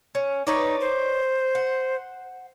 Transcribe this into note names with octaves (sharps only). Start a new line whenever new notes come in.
C#4
D#4 B4 C#5 D5
C5
F#5